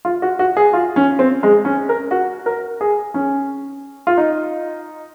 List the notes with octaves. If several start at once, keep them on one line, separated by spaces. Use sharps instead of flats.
F4
F#4
F#4
G#4
F4
C#4
C4
G#3
C#4
A#4
F#4
A#4
G#4
C#4
F4
D#4